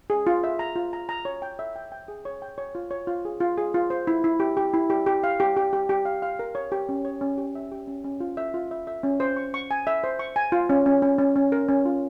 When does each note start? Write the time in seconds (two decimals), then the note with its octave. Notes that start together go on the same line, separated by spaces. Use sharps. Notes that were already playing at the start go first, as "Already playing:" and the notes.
0.10 G#4
0.27 F4
0.44 E5
0.59 A#5
0.76 F4
0.93 A#5
1.09 A#5
1.25 C#5
1.42 G5
1.59 E5
1.76 G5
1.92 G5
2.08 G#4
2.25 C#5
2.42 G5
2.58 C#5
2.75 F4
2.91 C#5
3.07 F4
3.25 G#4
3.40 F4
3.58 G#4
3.74 F4
3.90 C5
4.07 E4
4.24 E4
4.40 G4
4.57 G4
4.73 E4
4.90 G4
5.06 G4
5.24 F5
5.40 G4
5.56 G4
5.73 G4
5.89 G4
6.05 F5
6.22 F5
6.39 A#4
6.55 C#5
6.72 G4
6.89 C#4
7.05 C#5
7.21 C#4
7.38 G4
7.55 E5
7.71 G4
7.88 C#4
8.05 C#4
8.20 F4
8.37 E5
8.54 F4
8.71 E5
8.87 E5
9.03 C#4
9.20 C5
9.37 C#6
9.54 C#6
9.71 G#5
9.87 E5
10.04 C5
10.19 C#6
10.36 G#5
10.52 F4
10.70 C#4
10.86 C#4
11.02 C#4
11.19 C#4
11.36 C#4
11.52 A#4
11.68 C#4
11.85 F4